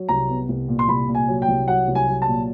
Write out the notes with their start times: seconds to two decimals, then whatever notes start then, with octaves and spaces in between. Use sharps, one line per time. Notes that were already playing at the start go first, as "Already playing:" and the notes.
Already playing: F#3
0.09 C2 A#5
0.29 B3
0.49 C2
0.68 A#2
0.79 C6
0.88 C2 B5
1.08 A#2
1.15 G#5
1.28 F#3
1.42 G5
1.49 C2
1.68 F#3 F#5
1.88 C2
1.95 G#5
2.08 F#3
2.22 A5
2.28 A#2